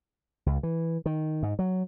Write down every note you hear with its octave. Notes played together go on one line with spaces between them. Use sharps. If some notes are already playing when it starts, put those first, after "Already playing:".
C#2
E3
D#3
G#2
F#3